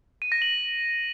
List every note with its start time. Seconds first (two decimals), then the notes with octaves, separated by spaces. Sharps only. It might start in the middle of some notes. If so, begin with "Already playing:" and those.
0.22 D#7
0.32 A#6
0.42 F#7